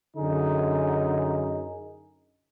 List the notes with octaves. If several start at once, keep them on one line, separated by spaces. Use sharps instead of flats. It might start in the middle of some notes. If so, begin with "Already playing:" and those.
F#2 D3 D#4 G#4